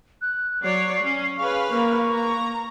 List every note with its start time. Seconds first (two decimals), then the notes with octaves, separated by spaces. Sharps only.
0.22 F#6
0.63 F#3 C#5 D5 C7
1.02 C#4
1.38 C#4 G#4 B4 C#5 F5 C#6
1.70 A#3 A#4 C#6
2.12 A#5